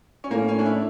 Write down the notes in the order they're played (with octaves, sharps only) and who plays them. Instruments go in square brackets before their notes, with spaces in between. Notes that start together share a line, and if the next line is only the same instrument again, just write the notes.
[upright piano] C#4
[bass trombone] A2 [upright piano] A#3
[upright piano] C#4
D4
E4